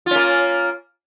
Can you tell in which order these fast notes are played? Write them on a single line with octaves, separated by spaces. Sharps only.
F4 C#4 A#3